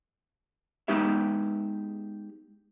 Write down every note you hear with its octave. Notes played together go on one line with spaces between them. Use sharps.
G#3 B3 D#4 G4 E5